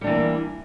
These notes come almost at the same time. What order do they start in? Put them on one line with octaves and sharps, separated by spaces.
G3 D4 E3 A#3